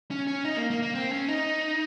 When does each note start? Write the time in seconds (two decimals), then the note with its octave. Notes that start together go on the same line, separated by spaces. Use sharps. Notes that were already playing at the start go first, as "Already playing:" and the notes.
0.11 C#4
0.27 C#4
0.45 D#4
0.57 A#3
0.70 A#3
0.82 A#3
0.95 C4
1.12 C#4
1.29 D#4